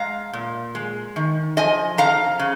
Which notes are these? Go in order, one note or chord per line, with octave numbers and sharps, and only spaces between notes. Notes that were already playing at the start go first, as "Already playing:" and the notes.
Already playing: G#3 F5 A#5
A#2
G#3
D#3
F3 D#5 G#5
F2 F5 A#5
C#3